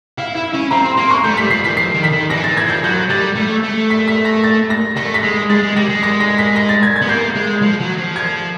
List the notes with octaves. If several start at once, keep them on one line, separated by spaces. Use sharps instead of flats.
E4 F5
E4 E5
C#4
C4 A#5
C6
A#3 C6
C#6
A3 G6
G3 B6
F3 C7
E3 B6
F3 C7
D#3
B6
D#3
E3 A#6
E3 A6
G#6
F3 G6
F#3 G6
G3 A6
A3
A3
B6
B6
A#6
A6
A#6
A3 A#6
B6
G#3
G#3 A6
G#3
G3 A#6
G#3
A#6
A#6
B6
A#6
A6
G#6
G#6
B3
A#3 G6
G#3
F3
F#3
F3
G#6